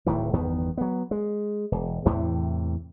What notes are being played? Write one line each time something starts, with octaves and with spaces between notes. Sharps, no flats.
D1 A2 D#3 E3
G1 E2 D#3 B3
F#3 B3
G#3
E1
E2 A2 C3 E3